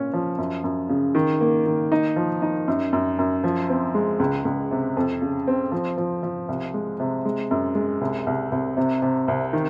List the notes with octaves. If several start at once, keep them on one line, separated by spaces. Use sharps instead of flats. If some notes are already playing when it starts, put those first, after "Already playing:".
Already playing: A#2 C#4
F3
F#2
F#2
C#3
D#3
A#3
D#3
D#4
F3
D#4
F#2
F#2
F#2
F3
C4
G#3
C#2
C#2
C3
F2
C#3
C4
F3
F3
F3
C2
G#3
C3
G#3
F#2
G#3
C2
C2
C2
C3
C3
C2
D#3